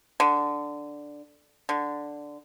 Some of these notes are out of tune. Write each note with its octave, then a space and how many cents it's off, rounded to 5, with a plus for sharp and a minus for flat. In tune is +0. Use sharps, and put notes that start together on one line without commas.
D3 +0
D3 +0